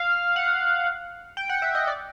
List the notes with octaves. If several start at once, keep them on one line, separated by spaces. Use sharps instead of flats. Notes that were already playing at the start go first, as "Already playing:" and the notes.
Already playing: F5
F#5
G5
F#5
E5
D#5
D5